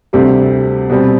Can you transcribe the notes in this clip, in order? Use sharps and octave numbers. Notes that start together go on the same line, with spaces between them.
D2 C3 G3 C4 G4
B2 G3 C4